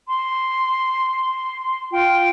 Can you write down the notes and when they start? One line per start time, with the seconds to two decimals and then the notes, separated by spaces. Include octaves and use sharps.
0.08 C6
1.92 F4 G5